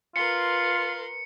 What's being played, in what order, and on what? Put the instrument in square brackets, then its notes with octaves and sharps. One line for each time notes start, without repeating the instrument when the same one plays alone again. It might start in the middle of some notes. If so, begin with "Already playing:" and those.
[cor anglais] F4 [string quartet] A#4 B4 C6 [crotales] C#7